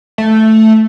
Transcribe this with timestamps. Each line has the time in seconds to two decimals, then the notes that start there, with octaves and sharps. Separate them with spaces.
0.18 A3